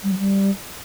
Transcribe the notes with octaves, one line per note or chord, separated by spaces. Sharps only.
G3
F#3
G3